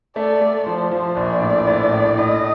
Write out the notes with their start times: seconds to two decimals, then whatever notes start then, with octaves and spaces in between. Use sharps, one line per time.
0.16 A3 D5
0.41 A3
0.66 F3 C5
0.91 F3
1.16 A#1 D5
1.41 A2
1.68 A2
1.92 A2
2.18 A2 D#5